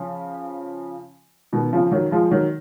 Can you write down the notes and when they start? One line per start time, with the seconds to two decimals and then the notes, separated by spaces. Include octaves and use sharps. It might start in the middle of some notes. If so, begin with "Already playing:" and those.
Already playing: C#3 F3
1.53 B2 D#3
1.73 C#3 F3
1.91 D#3 F#3
2.11 F3 G#3
2.31 D#3 F#3